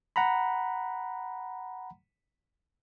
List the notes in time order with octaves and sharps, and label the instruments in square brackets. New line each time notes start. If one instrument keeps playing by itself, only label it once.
[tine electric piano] F#5 A#5 B5